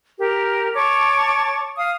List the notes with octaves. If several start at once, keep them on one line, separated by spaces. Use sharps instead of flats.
G4 A#4
C#5 A5 C#6 D6
F5 D#6